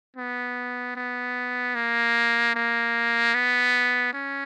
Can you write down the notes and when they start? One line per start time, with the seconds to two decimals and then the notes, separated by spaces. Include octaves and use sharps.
0.17 B3
0.96 B3
1.75 A#3
2.55 A#3
3.35 B3
4.13 C#4